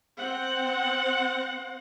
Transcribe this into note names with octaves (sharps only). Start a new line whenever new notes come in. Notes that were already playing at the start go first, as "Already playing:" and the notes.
C4 F#5